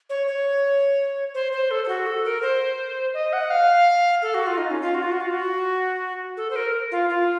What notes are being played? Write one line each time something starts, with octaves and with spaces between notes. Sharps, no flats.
C#5
C#5
C5
C5
A4
A4
F#4
A4
A#4
C5
D#5
F#5
F5
A4
F#4
F4
D#4
C#4
F4
F#4
F4
F#4
F4
F#4
A4
C5
A#4
F4
F4